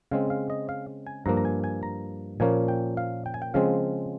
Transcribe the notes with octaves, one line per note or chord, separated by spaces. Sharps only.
C#3 G#3 C4 F5
F5
D#5
F5
G#5
G2 F3 A#3 A#5
A#5
G#5
G#5
A#5
A#2 F3 A#3 C#4 G#5
G5
F5
G5
G#5
G5
C#3 F3 G#3 C4 F5